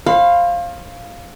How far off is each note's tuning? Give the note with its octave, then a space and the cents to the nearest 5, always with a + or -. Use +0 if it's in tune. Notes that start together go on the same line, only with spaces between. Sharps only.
C5 +40 F5 +0 B5 +35